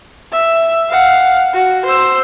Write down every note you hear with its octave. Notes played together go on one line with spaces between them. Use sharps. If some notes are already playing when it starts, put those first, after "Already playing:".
E5
F5 F#5
F#4
C5 E6